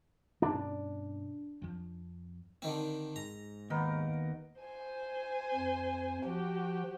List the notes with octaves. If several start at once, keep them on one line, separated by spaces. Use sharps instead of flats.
G2 B2 C#4 D4
F2 F3
D3 D#3 C4
G#2 A#5
D#2 D#3 B3 A#4
C5 G#5
F2
F3 F#4 G4